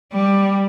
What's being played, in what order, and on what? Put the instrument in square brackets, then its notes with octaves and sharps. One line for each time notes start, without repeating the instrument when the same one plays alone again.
[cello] G3